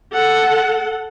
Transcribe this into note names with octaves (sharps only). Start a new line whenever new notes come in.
A4 F#5